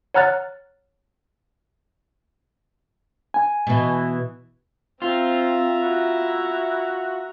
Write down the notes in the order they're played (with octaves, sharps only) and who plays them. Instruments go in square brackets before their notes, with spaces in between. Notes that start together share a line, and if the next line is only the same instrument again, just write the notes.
[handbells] C#5 F#5 A#5 F6 F#6 A6
[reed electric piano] G#5
[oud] B2 E3
[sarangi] C4 [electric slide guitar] F4 [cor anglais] C5 [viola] E5 A#5
[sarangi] E4 [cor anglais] F#4